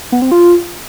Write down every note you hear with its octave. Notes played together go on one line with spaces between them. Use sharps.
B3
C4
F4